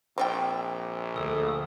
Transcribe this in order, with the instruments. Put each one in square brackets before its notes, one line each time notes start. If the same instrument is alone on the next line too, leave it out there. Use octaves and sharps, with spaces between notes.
[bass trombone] A#1 [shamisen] C4 F4 G5
[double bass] D2 A3 [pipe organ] A4 D#6